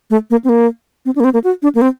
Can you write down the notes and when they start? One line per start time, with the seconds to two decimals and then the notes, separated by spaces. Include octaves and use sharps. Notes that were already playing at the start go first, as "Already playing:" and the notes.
0.10 A3
0.30 A#3
0.44 C4
0.49 A#3
1.05 C4
1.16 D4
1.20 A#3
1.24 C4
1.34 A#3
1.44 F#4
1.62 D4
1.75 A#3
1.82 C4